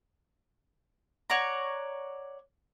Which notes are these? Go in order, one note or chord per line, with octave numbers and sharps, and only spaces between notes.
C#5 D5 F#5 A#5